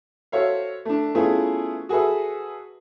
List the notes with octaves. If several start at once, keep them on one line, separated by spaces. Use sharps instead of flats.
F#4 A4 C5 C#5 E5 F5
A3 D4
A3 B3 C#4 E4 F4 G#4
F#4 G#4 A4 B4 E5